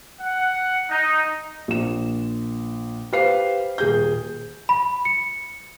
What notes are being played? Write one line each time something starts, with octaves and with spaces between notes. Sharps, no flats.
F#5
D#4
A#1 E7
G4 B4 C5 F5 C7
D#1 G#4 G6
B5
C#7